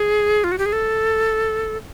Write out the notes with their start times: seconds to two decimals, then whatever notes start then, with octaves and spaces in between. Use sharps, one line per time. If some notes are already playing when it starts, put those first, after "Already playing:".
Already playing: G#4
0.44 F4
0.52 F#4
0.58 G4
0.66 G#4
0.73 A4